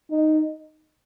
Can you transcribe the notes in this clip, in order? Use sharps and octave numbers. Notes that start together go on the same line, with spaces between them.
D#4